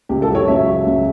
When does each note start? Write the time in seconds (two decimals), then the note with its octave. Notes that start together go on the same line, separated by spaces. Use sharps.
0.09 C#2 G4
0.22 A4
0.30 F#3
0.35 C#5
0.48 C#2 E5
0.67 F#3
0.86 C#2